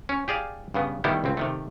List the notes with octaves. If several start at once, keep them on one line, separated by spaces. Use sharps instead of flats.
C#4
G4 G#4 D5 F5
G2 C#3 B3
D#3 G3 A3 B3 E4 G4
C#2 C4
C3 D#3 A3